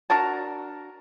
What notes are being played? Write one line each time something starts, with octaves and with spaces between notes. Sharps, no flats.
D4 F#4 A#4 A5